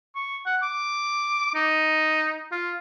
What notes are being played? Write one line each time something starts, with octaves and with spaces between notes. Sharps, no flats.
C#6
F#5
D6
D#4
F4